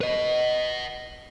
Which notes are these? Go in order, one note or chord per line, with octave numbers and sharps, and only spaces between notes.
B4 D#5